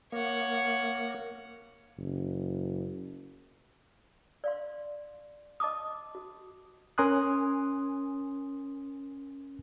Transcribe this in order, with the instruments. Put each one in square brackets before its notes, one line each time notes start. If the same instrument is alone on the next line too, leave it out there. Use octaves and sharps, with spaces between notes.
[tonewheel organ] A#3 [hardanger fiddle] C#5 F#5
[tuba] F#1
[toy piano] D5 F5 C6
D#5 A5 D6 D#6
F#4
[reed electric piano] C#4 A#4 G#5 C6 D#6 F#6